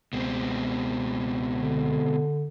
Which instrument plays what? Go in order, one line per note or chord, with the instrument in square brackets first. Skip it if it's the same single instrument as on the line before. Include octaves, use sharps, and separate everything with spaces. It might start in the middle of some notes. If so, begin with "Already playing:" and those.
[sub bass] C#2 [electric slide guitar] B2 G#3 C4
[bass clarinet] D3